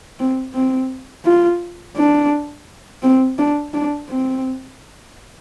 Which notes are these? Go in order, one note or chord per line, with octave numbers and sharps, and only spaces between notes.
C4
C4
F4
D4
C4
D4
D4
C4